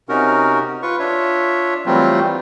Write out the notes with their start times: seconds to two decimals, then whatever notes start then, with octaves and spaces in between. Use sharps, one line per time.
0.09 C3 C#4 D#4 F#4 A#4
0.82 F4 B4 C#6
0.99 D4 F4 C#5 E5
1.86 E3 F#3 G3 A3 C4 F4